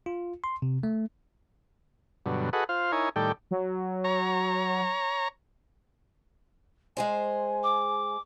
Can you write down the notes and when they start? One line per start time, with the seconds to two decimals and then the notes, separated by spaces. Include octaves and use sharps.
0.06 F4
0.44 C6
0.62 C3
0.83 A3
2.26 G2 B2 D3 F#3
2.53 F#4 G#4 A4 B4 D#5 F#5
2.69 F4 C5 F5
2.92 D#4 E4 A#4 C#5 G#5
3.16 A2 D#3 G3 A4 D5 G5
3.51 F#3
4.04 C#5 A#5
6.97 G#3 G#4 C5 G#5
7.63 D6